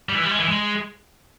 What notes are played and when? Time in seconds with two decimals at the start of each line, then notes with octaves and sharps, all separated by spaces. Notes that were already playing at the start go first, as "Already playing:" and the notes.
0.09 G3
0.15 E3
0.22 G3
0.31 G#3
0.40 E3
0.49 G#3